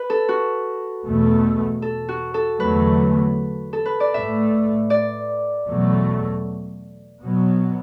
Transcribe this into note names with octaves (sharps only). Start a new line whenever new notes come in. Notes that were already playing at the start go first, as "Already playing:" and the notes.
Already playing: B4
A4
F#4
E2 B2 A3
A4
F#4
A4
E2 D3 F#3 A3 B4
A4
B4
D5
A2 A3 E5
D5
E2 B2 F#3 A3
B2 F#3 B3